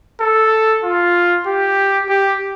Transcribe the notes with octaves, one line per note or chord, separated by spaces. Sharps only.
A4
F4
G4
G4